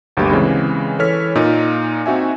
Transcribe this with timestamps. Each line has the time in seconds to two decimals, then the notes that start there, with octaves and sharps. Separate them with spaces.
0.17 G1 D2 F#3 A#3 G4 B5
0.31 C#3 E3 G#3 C4
0.99 E3 A4 C#5 F6 B6
1.35 A#2 D#4
2.06 C4 D#4 F#4 E5 G#5